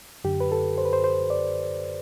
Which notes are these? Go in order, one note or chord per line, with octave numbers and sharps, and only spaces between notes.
F#2 D3 G4
B4
A4
C5
B4
C5
C5
D5